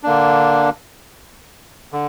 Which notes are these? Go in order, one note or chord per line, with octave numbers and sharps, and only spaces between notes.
D3 A#3 D4
D3